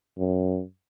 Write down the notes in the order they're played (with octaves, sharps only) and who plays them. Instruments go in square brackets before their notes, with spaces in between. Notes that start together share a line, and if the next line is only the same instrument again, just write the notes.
[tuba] F#2